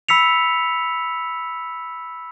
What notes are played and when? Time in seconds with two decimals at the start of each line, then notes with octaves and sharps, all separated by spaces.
0.09 B5 E6 B6 C#7 F7